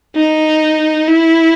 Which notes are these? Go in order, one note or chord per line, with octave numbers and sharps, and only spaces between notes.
D#4
E4